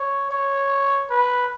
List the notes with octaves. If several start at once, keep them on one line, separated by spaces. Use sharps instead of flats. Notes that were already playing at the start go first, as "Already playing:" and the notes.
Already playing: C#5
C#5
B4